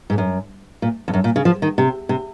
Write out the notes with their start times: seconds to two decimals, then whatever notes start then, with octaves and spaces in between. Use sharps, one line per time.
0.10 G#2
0.18 F#2
0.82 A#2
1.08 F2
1.14 F#2
1.24 A#2
1.36 C#3
1.45 F3
1.62 D#3
1.78 C3
2.09 C3